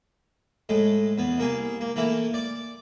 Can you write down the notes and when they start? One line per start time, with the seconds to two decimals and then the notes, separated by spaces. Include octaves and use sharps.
0.69 A2 G#3 A3
1.18 E2 B3
1.38 C2 A#3 G#4
1.81 A#3
1.96 E3 A3 A#3 E4
2.34 D5 D6